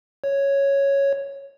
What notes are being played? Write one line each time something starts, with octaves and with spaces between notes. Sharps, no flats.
C#5